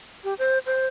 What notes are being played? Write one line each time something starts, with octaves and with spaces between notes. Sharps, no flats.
G4
C5
C5